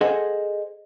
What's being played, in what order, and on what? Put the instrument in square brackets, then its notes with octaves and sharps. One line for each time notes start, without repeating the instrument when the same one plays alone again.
[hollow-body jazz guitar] G#4 A4 C5 D#5 F#5